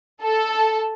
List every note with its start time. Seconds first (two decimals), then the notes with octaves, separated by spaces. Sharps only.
0.23 A4